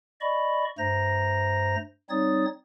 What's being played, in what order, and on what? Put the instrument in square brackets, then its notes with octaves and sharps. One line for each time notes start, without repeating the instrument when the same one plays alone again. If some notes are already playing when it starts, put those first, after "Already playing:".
[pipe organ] D5 D#5 B5 C#6
G2 A3 C5 A#5 A#6
G3 C4 D#4 C#5 D#6 A6